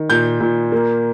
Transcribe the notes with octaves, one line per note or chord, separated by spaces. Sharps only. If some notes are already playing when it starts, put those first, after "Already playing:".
Already playing: D#3
A#2 G6
A#2
A#3